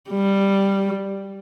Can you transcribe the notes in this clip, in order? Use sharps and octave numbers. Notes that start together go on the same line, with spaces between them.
G3